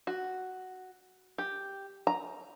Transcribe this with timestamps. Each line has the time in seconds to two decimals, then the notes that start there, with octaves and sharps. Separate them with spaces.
0.07 F#4
1.38 G4
2.07 A#5